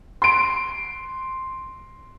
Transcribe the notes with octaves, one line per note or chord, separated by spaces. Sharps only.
C6 D7